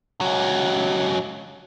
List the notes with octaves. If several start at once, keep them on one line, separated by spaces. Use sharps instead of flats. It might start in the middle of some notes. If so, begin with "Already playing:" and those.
C#2 F#3